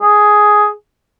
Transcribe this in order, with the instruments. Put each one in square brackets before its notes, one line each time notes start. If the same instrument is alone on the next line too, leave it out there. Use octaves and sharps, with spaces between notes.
[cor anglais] G#4